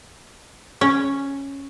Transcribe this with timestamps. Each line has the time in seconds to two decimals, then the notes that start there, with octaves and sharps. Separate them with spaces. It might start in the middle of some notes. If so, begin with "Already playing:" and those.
0.81 C#4